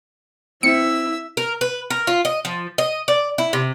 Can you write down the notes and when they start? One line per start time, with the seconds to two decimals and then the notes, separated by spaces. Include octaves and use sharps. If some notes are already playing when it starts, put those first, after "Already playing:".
0.63 C4 E4 E5 E6 C#7
1.37 A#4
1.61 B4
1.90 A#4
2.07 F4
2.25 D#5
2.45 F3
2.78 D#5
3.08 D5
3.38 E4
3.53 C3